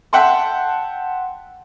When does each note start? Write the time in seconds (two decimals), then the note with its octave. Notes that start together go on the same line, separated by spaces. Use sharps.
0.13 E5 F#5 G5 A5 C6